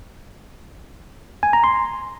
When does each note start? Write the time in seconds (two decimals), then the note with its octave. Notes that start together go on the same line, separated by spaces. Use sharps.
1.43 G#5
1.53 A#5
1.64 C6